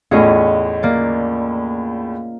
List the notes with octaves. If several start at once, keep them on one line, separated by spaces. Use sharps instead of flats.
E2 A2 C#4 F4 D#5
A#3 D5